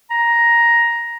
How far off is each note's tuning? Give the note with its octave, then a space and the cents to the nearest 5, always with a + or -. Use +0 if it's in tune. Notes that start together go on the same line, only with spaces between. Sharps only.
A#5 +10